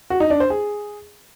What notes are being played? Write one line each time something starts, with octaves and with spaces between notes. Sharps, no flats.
F#4
D#4
D4
C5
G#4